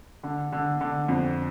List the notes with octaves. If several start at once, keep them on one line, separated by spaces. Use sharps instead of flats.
D3
D3
D3
F2